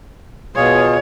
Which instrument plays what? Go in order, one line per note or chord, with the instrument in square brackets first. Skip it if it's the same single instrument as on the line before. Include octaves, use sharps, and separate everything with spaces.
[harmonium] B2 F4 G#4 [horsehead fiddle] C#5